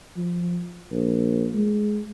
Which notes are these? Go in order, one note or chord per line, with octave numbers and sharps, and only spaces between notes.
F3
A#1
G#3